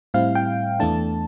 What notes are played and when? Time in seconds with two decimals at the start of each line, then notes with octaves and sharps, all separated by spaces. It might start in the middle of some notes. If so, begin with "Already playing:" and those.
0.14 A2 G3 C4 E4 F5
0.35 G5
0.80 E2 E3 A3 D4 A5